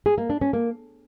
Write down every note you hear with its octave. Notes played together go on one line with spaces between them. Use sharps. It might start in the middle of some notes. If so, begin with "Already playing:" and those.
G#4
A#3
D4
C#4
A#3